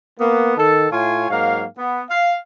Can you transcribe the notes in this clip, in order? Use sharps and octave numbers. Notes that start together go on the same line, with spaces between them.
A#3 B3
D#3 A4
A2 F4 C#5 F5 G#5
G#2 F#3 A#3 F5
B3
F5